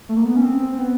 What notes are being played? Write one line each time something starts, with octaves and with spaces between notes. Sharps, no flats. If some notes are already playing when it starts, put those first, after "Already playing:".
A3
A#3
B3
C#4
C4
C4
C4
B3